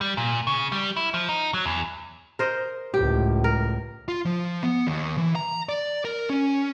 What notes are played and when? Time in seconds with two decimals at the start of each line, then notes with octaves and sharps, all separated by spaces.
0.01 G3
0.17 A#2
0.47 C#3
0.72 G3
0.97 E4
1.14 F3
1.29 D#4
1.54 F#3
1.66 E2
2.39 A#4 C5 D#5
2.94 C#2 A2 G4
3.44 A#4
4.08 F4
4.25 F3
4.63 B3
4.87 D#2
5.17 E3
5.35 A#5
5.69 D5
6.05 A#4
6.30 C#4